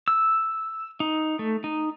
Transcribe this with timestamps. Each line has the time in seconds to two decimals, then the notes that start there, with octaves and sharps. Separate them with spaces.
0.08 E6
1.00 D#4
1.39 A3
1.64 D#4